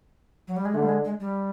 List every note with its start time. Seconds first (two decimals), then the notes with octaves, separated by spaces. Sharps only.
0.48 F#3
0.56 G3
0.65 G#3
0.74 D3 A3 D4
0.82 G3
0.89 G#3
1.05 G#3
1.20 G3